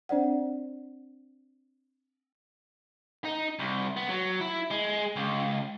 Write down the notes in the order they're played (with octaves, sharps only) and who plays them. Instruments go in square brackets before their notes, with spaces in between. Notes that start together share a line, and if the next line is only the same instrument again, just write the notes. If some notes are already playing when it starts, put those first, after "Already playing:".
[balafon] C4 D4 C5 D5 F#5
[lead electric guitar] D#4
C2
B3
F#3
E4
G#3
C#2